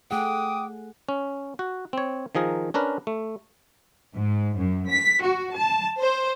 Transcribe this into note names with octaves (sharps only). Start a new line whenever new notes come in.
A3 G#4 F#5 G5 D6 D#6
C#4
F#4
C4 C#5
D#3 F3 G#4 A#4
C#4 D4 A#4 B4
A3
G#2
F#2
B6
F#4
A5
C5